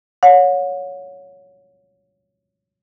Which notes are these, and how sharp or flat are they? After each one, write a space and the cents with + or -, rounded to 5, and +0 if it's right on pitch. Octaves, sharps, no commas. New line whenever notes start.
C#5 +10 F#5 -40